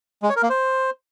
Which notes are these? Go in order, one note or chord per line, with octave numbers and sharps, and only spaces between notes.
G#3
C#5
A#4
A#3
C5